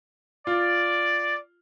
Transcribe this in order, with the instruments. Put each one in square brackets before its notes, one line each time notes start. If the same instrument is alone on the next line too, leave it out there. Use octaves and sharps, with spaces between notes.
[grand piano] F4 [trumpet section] D5